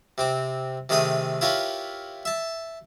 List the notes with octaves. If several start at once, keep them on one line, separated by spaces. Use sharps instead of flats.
C3 C4 D6
C3 D#3 A3 G#4 G5 D#6
E4 F4 G4 A#4 B4 C#5
E5 A5